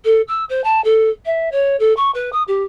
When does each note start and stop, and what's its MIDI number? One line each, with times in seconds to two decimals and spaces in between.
0.04 0.21 69
0.28 0.44 88
0.49 0.63 72
0.64 0.83 81
0.84 1.09 69
1.25 1.49 76
1.52 1.76 73
1.79 1.95 69
1.96 2.11 85
2.14 2.30 71
2.32 2.43 87
2.47 2.63 67